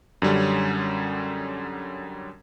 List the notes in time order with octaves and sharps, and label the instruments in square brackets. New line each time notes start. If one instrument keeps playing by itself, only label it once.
[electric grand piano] F#2 D3 G3 C#4